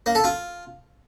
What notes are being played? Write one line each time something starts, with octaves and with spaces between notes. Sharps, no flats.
A#3
A4
F4